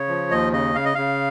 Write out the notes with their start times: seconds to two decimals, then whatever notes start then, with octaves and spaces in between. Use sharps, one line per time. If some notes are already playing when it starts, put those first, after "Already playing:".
Already playing: C#3 C#5
0.08 F3
0.31 D#2 D#5
0.52 C#3 D#5
0.75 C#3 F5
0.85 D#5
0.95 C#3 F5